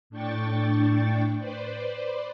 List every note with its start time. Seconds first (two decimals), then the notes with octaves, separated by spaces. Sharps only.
0.10 A2 D4 G5 C#6 A6
1.38 B4 C5 D5